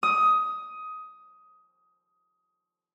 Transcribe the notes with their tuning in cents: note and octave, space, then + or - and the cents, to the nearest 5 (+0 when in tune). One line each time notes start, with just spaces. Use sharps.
D#6 +15